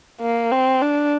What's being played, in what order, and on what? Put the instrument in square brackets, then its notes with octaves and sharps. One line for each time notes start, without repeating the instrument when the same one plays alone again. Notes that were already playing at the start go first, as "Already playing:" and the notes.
[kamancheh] A#3
C4
D4